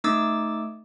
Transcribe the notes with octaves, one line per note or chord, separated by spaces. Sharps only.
A3 D#4 D6 E6 A6